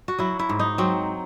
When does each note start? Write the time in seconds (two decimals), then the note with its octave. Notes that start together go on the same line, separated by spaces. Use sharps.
0.08 F#4
0.19 F#3 E4
0.39 E4
0.49 G#2
0.59 D#4
0.78 F#3 C4